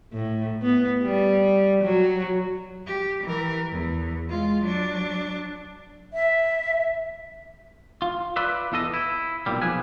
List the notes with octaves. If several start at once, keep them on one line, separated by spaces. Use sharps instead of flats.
A2
B3
G3
F#3
G4
E3 A#4
E2
G#3 F4
F#3 D4
E5
F4
F4 B4 D5 E5
E2 E3 A4 D#5
E4
B1 A#2 G3
B1 F3 G#4 B4 G#5